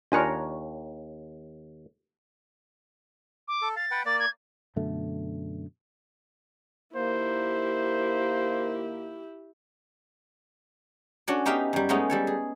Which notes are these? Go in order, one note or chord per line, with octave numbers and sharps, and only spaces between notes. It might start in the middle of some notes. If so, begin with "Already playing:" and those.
D#2 D4 F4 A#4 C#5 G#5 F#6
D6
A4
F5 A6
B4 F#5 G5
A#3 D5 A6
G#6
F#2 B2 D3 A3
A#2 D#3 A#3 E4 G4 C5
C#4 D4 F#4 C#5 D5
B3 D#4 G4 E5 F5 G5
F#2 G3
G#3 A3 B3 C#4 D#4
G3 A4 C#5
G#4